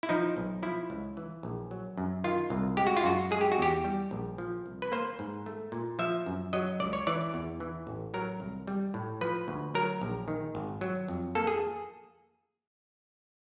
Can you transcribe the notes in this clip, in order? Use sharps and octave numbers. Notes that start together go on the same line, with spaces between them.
E4
F3 D#4
B1
F3 E4
C#2
E3
A#1
F#3
F#2
D#3 F4
C2
G#3 G4
F#4
F4
F#2 F#4
G#3 G#4
G4
F#4
E2 G4
G3
A#1
F3
C2
B4
A#3 C5
G#2
A3
A#2
F3 E5
F#2
F#3 D#5
C#2 D5
C#5
E3 D5
E2
E3
A1
F#3 A#4
C2
G3
A2
F3 B4
D2
F#3 A#4
A#1
D#3
G#1
F#3
F2
A#3 A4
G#4